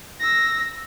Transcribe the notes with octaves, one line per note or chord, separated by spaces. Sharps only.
E6 A#6